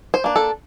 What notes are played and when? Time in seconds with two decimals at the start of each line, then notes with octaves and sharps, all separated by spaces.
0.14 C5
0.24 A#3 D4
0.36 A4